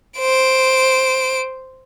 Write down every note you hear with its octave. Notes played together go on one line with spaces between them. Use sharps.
C5 D7